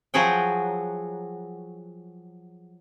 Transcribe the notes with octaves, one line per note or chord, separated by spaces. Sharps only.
F3 F#3 F#4 G#4 F#5 G5